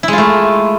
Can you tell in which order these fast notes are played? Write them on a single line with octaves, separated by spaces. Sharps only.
E4 G#3 F4 A3